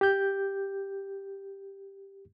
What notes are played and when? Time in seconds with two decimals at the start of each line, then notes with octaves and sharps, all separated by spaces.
0.01 G4 G6